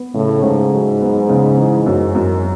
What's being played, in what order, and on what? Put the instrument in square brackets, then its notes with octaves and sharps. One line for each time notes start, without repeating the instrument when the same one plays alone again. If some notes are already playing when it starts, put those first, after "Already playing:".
Already playing: [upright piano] B3
[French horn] A2 [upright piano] C#3
[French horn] G#2 [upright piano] C#3
[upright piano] F#3
B3
C#3
E3
F#2
F#2